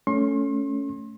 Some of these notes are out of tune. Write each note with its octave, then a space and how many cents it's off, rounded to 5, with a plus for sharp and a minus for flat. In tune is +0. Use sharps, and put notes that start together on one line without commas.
A3 +0 C#4 +10 C6 +40